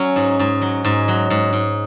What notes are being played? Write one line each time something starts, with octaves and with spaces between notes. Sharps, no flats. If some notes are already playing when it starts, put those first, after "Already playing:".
Already playing: F#3 C#4
G#2
G#2
F#3
G#2
F#3
G#2
G#2